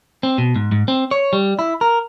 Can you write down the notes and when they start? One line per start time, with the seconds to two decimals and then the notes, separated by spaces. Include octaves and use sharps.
0.23 C4
0.38 B2
0.55 G#2
0.72 G#2
0.88 C4
1.11 C#5
1.33 G3
1.59 E4
1.81 A#4